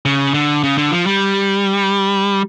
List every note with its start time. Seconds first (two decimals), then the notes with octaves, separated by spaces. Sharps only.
0.05 C#3
0.34 D3
0.63 C#3
0.78 D3
0.91 F3
1.06 G3